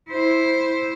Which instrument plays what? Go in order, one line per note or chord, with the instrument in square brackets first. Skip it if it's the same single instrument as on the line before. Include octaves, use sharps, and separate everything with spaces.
[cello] E4 C5